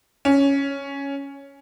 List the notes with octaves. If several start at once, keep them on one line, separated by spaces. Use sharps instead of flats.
C#4